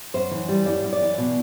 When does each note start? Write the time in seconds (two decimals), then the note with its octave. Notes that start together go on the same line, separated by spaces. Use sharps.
0.14 F#2 C5
0.31 E3
0.49 G3
0.66 F#2 D5
0.83 F#2
0.93 D5
1.01 E3
1.18 B2